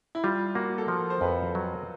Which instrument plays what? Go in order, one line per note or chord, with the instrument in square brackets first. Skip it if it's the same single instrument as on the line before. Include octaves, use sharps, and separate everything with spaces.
[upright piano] E4
[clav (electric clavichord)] G3 [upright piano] F4
[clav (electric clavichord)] A#3 [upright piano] F#4
[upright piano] A4
[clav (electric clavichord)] F3 [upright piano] A#4
[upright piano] C5
[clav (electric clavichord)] F2 [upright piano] B4
[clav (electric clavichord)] F#3